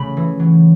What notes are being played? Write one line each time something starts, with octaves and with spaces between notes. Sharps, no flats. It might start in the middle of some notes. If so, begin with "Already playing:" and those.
Already playing: C#3 A3 B5
E3
F#3